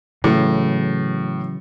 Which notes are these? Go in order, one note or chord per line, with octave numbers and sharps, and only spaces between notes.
A2 C#3 E3 F#3